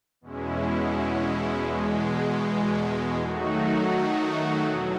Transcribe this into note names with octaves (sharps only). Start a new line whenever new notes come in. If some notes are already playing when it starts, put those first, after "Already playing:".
E2 B2 G#3 C#4 E4
E2 B2 G#3
D#3 F#3 A3 D#4 F#4
E2 B2 F#3